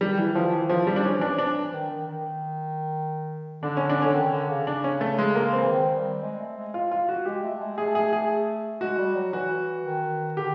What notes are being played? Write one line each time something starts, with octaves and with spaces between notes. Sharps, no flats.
D#3 G3
E3
F3
E3
F3
G3
D4
E3 C#4
F3
E3 D4
F3
D4
E3
D#3
D#3
D#3
D3 D4
C#4
D4
D3 C#4
D#3
D3
C#3
D4
C#4
A3
G#3
A#3
C4
E3
D#3
G3
G#3
A3
G#3
F4
F4
F#4
G#3 G4
A3
G#3
A3 G#4
G#4
G#4
G#3 F#4
G3
F#3
E3 F#4
D#3
D3 G4